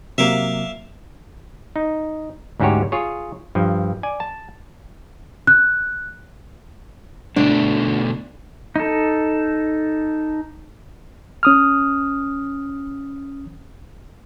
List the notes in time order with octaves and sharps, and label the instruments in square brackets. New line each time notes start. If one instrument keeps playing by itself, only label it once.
[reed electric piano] C3 F#3 A#3 [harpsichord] E5 F5 D6
[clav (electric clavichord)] D#4
D2 G#2 C#4 F#4 G4 C#5
F4 G#4 C#5
G2 F3
D5 G#5
A5
[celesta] F#6
[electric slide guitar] B2 D3 A3 [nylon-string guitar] D4
[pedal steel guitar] D#4 A4
[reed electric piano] C#4 D#6 F6